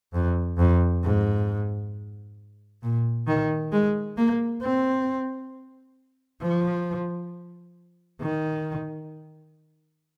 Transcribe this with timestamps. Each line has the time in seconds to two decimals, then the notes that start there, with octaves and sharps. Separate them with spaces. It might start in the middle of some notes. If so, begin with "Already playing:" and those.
0.13 F2
0.58 F2
1.04 G#2
2.83 A#2
3.28 D#3
3.72 G#3
4.17 A#3
4.62 C4
6.41 F3
8.21 D#3